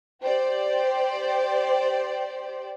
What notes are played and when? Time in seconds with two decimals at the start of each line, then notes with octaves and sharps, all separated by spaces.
0.21 G4 C5 D5